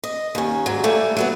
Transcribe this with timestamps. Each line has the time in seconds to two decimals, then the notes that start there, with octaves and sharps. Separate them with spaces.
0.04 D#5
0.35 D#2 C#4
0.66 G#2 F#3
0.84 G3 A3 A#3
1.17 F#3 A3 B3